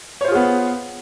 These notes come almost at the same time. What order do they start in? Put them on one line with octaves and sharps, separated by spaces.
C#5 C5 F4 G#4 B3